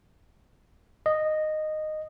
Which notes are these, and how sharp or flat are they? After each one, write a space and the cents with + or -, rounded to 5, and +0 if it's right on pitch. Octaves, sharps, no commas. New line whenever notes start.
D#5 -10